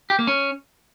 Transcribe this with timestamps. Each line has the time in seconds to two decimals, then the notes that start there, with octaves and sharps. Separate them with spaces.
0.10 G4
0.19 A#3
0.27 C#4